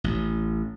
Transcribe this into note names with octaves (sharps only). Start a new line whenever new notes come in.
A1